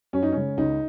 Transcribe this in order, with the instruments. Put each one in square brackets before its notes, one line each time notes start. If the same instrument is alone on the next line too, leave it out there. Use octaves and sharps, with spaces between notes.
[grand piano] F#2 C#4
D#4
C#3 G#3 C#4
C#2 D#4